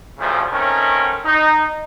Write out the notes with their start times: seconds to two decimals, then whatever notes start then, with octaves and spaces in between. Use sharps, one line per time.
0.19 D2 G2 C#3 F3 A3
0.52 D#3 A3 C4 C#4 A#4
1.25 D#4